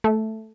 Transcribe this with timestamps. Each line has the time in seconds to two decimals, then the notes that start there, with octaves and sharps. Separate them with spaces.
0.04 A3